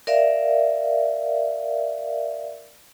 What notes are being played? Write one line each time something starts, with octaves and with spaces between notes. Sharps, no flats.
A#4 D5 E5 F5